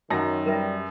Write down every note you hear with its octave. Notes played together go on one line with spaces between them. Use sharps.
F#2 D#3 F#3 A#6
G3 A#4 B4 E5